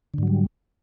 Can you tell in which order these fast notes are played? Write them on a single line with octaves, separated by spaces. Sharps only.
D3 G#2 F#3 G3